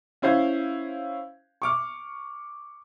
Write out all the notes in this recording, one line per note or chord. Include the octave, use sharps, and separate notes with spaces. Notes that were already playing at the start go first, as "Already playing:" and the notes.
C#4 E4 C5 F5 G#6
C#6 D6 F6